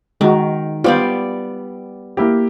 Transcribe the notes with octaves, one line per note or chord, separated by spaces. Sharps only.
D#3 G#3 D#4 F#4
G3 B3 F4 C5 D5
A#3 E4 G4